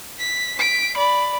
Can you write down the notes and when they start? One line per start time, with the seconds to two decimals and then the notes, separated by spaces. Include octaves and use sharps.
0.19 B6
0.59 B6 D7
0.97 D5 B5